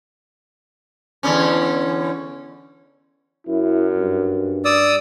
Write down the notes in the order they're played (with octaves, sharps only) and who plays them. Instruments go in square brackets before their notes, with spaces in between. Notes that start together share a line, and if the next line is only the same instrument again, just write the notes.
[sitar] E2 D3 C#4
[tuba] F#2 [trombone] E4
[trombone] G2
[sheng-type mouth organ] D5 D#6 E6